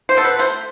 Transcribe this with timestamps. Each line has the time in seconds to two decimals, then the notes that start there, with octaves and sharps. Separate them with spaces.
0.09 C5
0.16 B2 A4
0.25 B4
0.39 A3 C5